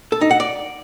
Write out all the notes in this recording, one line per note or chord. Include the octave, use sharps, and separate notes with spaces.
A4
D#4
F#5
D5